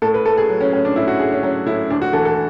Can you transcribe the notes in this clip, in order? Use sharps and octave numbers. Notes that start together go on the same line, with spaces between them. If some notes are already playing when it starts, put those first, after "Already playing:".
A2 A4
B4
A3 A4
G#4
F#3
C#4
A2 C#4
D4
A2 E4
F#4
A3 G#4
C#4
F#3 C#4
A2 E4
D2 D4
F#4
E3 A4
A4